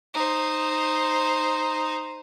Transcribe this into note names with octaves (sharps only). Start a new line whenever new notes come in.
D#4 C5